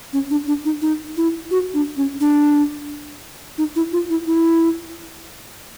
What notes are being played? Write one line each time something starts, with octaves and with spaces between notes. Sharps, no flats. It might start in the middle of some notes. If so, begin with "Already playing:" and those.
C#4
D4
D4
D#4
D#4
E4
F#4
D4
C#4
D4
D#4
E4
F4
E4
E4